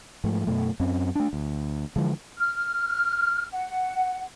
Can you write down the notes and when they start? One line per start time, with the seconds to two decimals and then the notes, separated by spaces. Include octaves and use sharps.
0.24 G#2 F3 A3
0.47 F#2 B2 A3
0.80 F#2 C4 C#4
1.15 A3 D4
1.33 D2
1.96 D3 E3 F3 G#3
2.38 F6
3.52 F#5